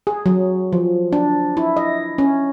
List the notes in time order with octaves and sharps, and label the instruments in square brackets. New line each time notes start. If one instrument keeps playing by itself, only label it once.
[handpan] G#4
F#3
F3
D4
E4
D#5
C#4